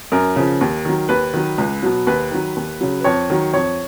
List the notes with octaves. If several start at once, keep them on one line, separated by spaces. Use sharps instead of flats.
F#2 A#4
C#3 F3
D#2
D#3 F#3
D#2 B4
D#3 F#3
C#2
B2 F#3
D#2 B4
D#3 F#3
D#2
C#3 F#3
B4
F2 C#5
D#3 F#3
F2 C#5